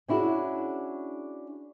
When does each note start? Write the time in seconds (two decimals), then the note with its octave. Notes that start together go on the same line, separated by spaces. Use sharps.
0.08 C#4 D4 E4 F#4 G#4